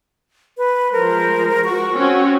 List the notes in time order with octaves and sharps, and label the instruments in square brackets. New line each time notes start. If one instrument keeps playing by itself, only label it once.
[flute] B4
[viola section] F3 G#3 C5 [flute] A#4
[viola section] F#4 [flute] C#6
[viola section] C4 C#4 F#4